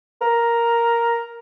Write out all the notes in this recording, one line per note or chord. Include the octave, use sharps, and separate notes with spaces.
A#4